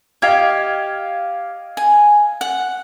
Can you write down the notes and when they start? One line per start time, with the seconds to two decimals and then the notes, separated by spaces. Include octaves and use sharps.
0.22 G4 D#5 F5 G#6
1.77 G#5
2.41 F#5